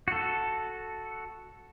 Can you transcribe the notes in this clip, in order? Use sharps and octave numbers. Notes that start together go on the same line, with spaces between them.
F#4 A4